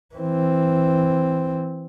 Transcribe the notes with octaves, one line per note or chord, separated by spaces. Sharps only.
E3 C4